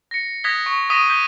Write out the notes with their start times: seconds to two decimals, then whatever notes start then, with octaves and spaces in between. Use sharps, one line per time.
0.11 A#6 C#7
0.44 D#6 F#6 G#6 A#6 B6 G7
0.66 C#6
0.90 C#6 D#6 A#6 B6 D#7 G7
1.08 G6 B6 D#7 G7